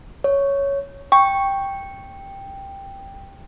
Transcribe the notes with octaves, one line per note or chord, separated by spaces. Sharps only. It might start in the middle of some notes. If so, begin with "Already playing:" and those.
C#5
G5 C#6